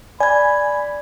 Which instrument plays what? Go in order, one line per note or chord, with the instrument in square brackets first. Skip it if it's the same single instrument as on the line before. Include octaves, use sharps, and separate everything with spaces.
[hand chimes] D5 G#6 [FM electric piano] G#5 [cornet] B5